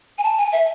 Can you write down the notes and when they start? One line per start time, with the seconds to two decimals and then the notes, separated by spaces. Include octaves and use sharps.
0.18 G#5
0.24 A5
0.38 G#5
0.52 E5